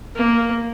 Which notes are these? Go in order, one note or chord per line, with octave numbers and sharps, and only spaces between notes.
A#3